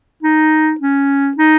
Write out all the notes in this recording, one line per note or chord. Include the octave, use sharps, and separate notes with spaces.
D#4
C#4
D#4